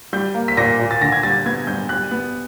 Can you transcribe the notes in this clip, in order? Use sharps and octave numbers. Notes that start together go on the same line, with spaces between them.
G3 G6
A#3
B6
A#2 A#6
A#2
A6
D3 A#6
G#6
G3 A6
B3 G#6
G2 G6
G3 F#6
B3